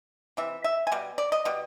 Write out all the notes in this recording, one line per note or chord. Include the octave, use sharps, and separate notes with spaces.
C3 E3 E5
E5
G#5
B2 G3
D5
D#5
B2 G3